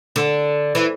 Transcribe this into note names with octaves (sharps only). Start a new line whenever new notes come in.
D3
E3